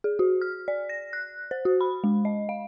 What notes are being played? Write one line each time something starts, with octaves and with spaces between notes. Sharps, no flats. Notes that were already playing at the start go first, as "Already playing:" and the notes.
G#4
F#4
F6
D5
A#6
F#6
C5
F#4
B5
G#3
D#5
F5